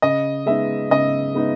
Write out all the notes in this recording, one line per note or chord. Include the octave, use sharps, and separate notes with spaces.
C#3 D#5
G#3 B3 D#4 E5
C#3 D#5
G#3 B3 D#4